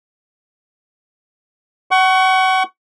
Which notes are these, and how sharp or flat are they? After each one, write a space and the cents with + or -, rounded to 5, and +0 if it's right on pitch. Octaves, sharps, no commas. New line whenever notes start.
F#5 +30 C#6 +0